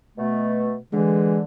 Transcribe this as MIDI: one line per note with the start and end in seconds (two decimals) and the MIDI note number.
0.18 0.76 47
0.18 0.76 57
0.93 1.42 50
0.93 1.42 52
0.93 1.40 56